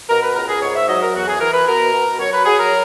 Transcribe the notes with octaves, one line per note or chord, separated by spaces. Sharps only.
B2 A#4
B4
C#2 A#4
G#4
G#2 C#5
E5
F#3 D#5
A#4
E2 F#4
G#4
E3 A#4
B4
B2 A#4
B2
F#3 C#5
B4
F#3 G#4
A#4